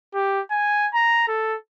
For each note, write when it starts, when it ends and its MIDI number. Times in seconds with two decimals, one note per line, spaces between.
0.14 0.40 67
0.51 0.86 80
0.94 1.27 82
1.28 1.55 69